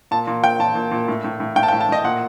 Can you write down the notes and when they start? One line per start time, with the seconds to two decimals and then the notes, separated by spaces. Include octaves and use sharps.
0.11 A#2 A5
0.27 A#2
0.44 A#2 G5
0.59 A#2 A5
0.75 A#2
0.91 A#2
1.08 A2
1.24 A2
1.40 A2
1.56 A2 G5
1.63 A5
1.68 G5
1.72 A2
1.81 A5
1.89 A2 D#5
2.04 A#2 F#5